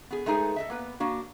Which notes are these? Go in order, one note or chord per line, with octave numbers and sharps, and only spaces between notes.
B3 G#4
G#3 A3 D#4 G#4 B4 G#5
A4 D#5 E5
A#3 B3 B4
A#3 D4 F#4